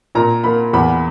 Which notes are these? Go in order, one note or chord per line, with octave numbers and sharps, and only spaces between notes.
A#2 A#5
A#3 B5
E2 B5